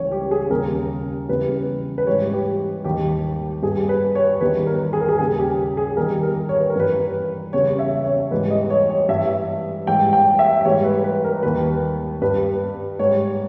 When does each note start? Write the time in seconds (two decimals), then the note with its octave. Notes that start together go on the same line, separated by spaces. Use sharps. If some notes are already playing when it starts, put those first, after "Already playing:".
Already playing: C#2 C#3 E3 G3 C#5
0.11 G4
0.31 G#4
0.50 D#2 C#3 G3 A#4
1.29 E2 C#3 E3 G3 B4
1.98 B4
2.07 G#2 E3 G3 C#5
2.33 G4
2.84 D#2 D#3 G3 G4
3.62 G2 G3 G#4
3.89 B4
4.15 C#5
4.41 E2 D#3 G3 B4
4.67 A#4
4.93 G#4
5.00 A#4
5.09 G#4
5.19 D#2 C#3 G3 G#4
5.38 G4
5.77 G#4
5.97 E2 D#3 G3 A#4
6.23 A#4
6.49 C#5
6.59 B4
6.70 A#4
6.75 G2 E3 G3 B4
7.53 E2 C#3 G3 C#5
7.79 E5
8.05 C#5
8.31 G#2 E3 G3 B4
8.50 D#5
8.70 C#5
8.90 C#5
9.09 G2 E3 G3 E5
9.87 G#2 E3 G3 G5
10.13 G5
10.39 E5
10.65 G#2 E3 G3 C#5
10.84 B4
11.04 B4
11.24 A#4
11.43 D#2 D#3 G3 B4
12.21 G2 G3 B4
12.99 G#2 G3 C#5